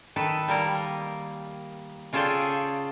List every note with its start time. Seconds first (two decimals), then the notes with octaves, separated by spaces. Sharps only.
0.16 D#3 A4 B4
0.48 G3 A#3 A#4
2.13 C#3 F4 G#4 A4 D5 G5